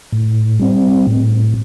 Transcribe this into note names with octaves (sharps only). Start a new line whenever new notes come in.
A2
G3 C4
A2